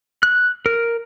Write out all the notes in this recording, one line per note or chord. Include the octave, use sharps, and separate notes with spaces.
F#6
A#4